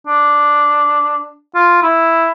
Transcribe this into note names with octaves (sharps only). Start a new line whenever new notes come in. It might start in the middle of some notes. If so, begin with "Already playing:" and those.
D4
F4
E4